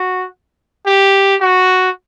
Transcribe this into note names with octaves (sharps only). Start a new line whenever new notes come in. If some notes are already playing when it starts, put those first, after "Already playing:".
Already playing: F#4
G4
F#4